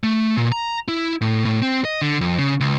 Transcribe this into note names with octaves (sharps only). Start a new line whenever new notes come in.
A3
A#2
A#5
E4
A2
A2
C4
D#5
D3
F2
C#3
C#2